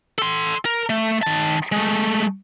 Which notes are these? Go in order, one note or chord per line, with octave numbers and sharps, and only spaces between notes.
A4 C6
A#4
A3
D#3 A5
G#3 A3